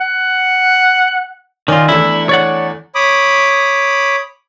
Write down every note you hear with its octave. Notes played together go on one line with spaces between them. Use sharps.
F#5
D#3 F4 D5 D#5 G#5
E2 A3 D4 E4
C#5 D5 F#5
C#5 B5 D6 D#6